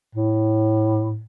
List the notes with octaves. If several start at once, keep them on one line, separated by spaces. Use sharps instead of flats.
A2